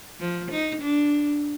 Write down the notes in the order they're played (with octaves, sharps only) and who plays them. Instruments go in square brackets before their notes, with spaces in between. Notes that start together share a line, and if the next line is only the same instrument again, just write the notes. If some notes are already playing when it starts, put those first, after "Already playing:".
[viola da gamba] F3
D#4
D4